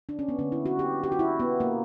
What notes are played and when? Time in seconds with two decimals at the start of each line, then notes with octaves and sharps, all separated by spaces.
0.09 D4
0.19 C#4
0.29 B3
0.39 D3 A#3 C#4
0.52 E4
0.66 F#4
0.79 G4
1.04 G4
1.12 F#4
1.19 E4
1.39 B3
1.60 A#3